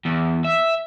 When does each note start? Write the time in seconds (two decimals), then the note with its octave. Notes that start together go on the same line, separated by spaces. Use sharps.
0.05 E2
0.45 E5